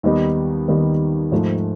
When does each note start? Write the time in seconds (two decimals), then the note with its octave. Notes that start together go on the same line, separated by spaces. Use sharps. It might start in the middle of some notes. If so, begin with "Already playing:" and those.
0.03 D#2 D#3 G3 B3 D#4
0.68 D#2 D#3 G3 B3 D#4
1.32 G#2 F3 A3